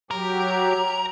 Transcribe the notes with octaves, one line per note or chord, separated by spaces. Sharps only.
F#3 G4 A#4